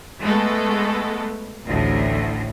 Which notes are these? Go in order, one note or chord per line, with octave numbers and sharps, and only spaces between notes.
G#3 A3 B3 A4
A1 D2 A2